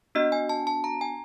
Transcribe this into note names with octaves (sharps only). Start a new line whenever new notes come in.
B3 D4 F#4 D#5
G#5
A5
A5
A#5
G#5